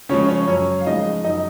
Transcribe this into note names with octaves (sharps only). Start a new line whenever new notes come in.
C#3 F3 G#3 C#4 C#5
C#4 C#5
F#2 C#4 C#5
F5
C#3 F3 G#3 D#4 D#5
F#2 D#4 D#5